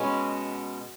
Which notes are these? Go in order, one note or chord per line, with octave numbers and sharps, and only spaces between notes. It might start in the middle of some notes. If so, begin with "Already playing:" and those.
Already playing: B2 G#3 B3 C#4